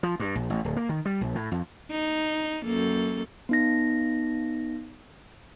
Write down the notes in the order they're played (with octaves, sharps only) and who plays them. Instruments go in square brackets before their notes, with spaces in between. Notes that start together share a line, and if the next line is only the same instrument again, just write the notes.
[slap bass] F3
G2
A#1
A1
D1
A#3
D#3
G3
A#1
A2
F2
[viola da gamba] D#4
F#2 A#3 A4
[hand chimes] B3 D#4 A#6